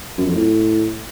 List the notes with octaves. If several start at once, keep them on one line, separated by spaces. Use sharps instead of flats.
F#2
F2
A2